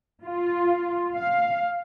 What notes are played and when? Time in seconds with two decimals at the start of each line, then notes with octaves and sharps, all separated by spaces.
0.25 F4
1.16 F5